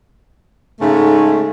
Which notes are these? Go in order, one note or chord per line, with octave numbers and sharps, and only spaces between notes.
G#2 C#3 A3